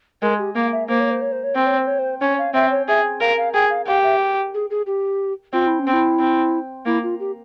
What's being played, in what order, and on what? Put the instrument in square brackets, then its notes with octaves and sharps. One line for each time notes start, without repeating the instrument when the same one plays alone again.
[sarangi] G#3 [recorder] A#4
[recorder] G4
[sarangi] A#3 [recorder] F5
[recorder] E5
[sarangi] A#3 [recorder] C5
[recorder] C#5
C5
C#5
C5
C#5
[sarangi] C4 [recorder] C5
[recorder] C#5
C5
C#5
C5
[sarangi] C#4 [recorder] C#5
[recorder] F5
[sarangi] C4 [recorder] E5
[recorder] C#5
[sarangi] G#4 [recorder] E5
[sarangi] A#4 [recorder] F5
[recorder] F5
[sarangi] G#4 [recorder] G5
[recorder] F5
[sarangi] G4 [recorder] F5
[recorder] E5
G#4
G#4
G4
[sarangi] C4 [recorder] F4
[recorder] E4
C#4
[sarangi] C4
[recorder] E4
[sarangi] C4
[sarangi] A#3 [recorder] E4
[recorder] F4
G4